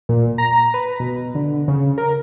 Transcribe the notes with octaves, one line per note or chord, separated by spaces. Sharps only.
A#2
A#5
B4
B2
D3
C#3
A#4